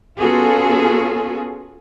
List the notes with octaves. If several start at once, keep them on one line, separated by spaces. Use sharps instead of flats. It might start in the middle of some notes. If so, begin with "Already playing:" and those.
B3 C#4 F4 F#4 G#4 A4